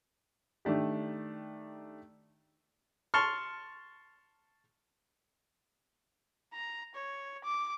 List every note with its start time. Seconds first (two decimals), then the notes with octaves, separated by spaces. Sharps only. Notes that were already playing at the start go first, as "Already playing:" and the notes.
0.65 D#3 A3 D4 G4
3.14 A5 C6 C#6 F6
6.53 A#5
6.95 C#5
7.44 D6